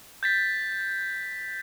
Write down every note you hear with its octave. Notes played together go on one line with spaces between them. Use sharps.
G6 A6 B6